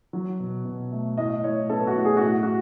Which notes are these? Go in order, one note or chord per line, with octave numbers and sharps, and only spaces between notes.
F#3
B2
B2
A3
A2 D#5
A2 C#5
B3 A4
F#4
A2
G#4
F#4
A2
F#4